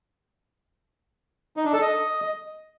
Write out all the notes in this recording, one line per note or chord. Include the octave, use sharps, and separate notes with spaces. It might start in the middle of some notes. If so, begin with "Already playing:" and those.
D#4
D4
A4
D#5